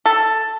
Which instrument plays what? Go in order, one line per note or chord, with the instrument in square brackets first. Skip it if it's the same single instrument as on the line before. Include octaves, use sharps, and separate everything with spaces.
[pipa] A4